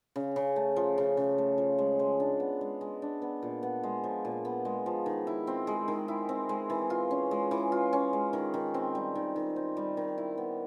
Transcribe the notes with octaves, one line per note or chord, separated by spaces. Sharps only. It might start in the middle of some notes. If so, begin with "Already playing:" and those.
C#3
C#3
A3
F3
C#3
C#3
A3
F3
G#3
G#3
D4
B3
G#3
G#3
D4
B3
A#2
B3
G#3
F3
A#2
B3
G#3
F3
D#3
E4
C4
G#3
D#3
E4
C4
G#3
E3
F4
C#4
G#3
E3
F4
C#4
G#3
D#3
D#3
C4
G3
D#3
D#3
C4
G3
D#3
E4
B3